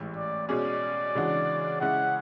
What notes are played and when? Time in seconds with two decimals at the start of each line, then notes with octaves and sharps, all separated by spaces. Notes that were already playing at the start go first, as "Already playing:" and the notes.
Already playing: A1 G#2 E3
0.16 D5
0.48 B2 G#3 C#4 G#4 D5
1.15 C#3 E3 G#3 D4 F#4
1.81 C#3 G#3 C#4 E4 F#5